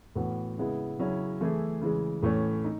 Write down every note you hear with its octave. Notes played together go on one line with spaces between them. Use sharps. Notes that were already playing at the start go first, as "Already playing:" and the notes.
A2 E3 B3 F#4
C#3 G#3 B3 E4
C#3 F#3 C#4 E4
E3 A3 E4 G#4
C#3 E3 G#3
A2 E3 A3 C#4
D#4